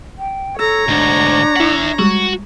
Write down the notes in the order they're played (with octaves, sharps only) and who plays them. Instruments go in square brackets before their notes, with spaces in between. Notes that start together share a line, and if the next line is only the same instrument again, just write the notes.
[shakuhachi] G5
[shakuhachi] A4 [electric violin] C#5 A#5 [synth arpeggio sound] E6
[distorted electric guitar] D2 G#2 [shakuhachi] D4
[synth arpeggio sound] E4 B6 [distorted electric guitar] E5 F#5
[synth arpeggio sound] G3 G#3 [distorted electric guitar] F#4